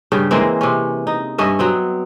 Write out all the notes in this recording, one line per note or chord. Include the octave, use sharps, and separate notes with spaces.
G2 C#3 G3
E3 G#3 A#3 C4
C3 C#4
D#4
G2 C#4 D#5 E5
F#3 B3 C4